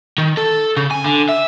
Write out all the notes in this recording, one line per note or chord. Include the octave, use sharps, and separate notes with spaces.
D#3
A4
C#3
G#5
D3
E5